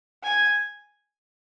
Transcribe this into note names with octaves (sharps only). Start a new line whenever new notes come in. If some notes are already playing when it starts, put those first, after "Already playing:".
G#5